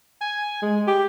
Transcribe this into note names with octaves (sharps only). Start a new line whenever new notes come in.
G#5
G#3
G4